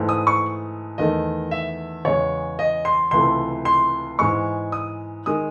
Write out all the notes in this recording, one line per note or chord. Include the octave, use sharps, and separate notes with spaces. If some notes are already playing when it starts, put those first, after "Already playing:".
Already playing: G#2 E3 A3
D#6
C#6
E2 D#3 A3 D#5
E5
E2 C#3 G#3 C#5
D#5
C6
C#2 C3 E3 A3 C6
C6
G#2 E3 G#3 C#6
D#6
D#3 G#3 D#6